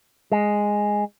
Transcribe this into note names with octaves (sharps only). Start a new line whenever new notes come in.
G#3